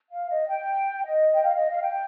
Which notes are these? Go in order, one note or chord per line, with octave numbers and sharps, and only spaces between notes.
F5
D#5
G5
D#5
G5
F5
D#5
F5
G5